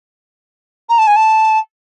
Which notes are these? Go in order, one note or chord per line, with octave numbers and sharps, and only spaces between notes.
A#5
A5
G#5
A5